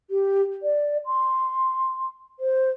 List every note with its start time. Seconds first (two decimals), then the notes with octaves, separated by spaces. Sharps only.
0.10 G4
0.63 D5
1.06 C6
2.39 C5